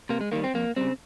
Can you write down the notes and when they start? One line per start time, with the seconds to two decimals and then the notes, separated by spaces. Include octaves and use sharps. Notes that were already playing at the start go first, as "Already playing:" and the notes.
0.09 C3 A#3
0.21 G#3
0.32 D#3 G3 A#3
0.44 C4
0.54 F2 A#3
0.76 C#3 G3 C4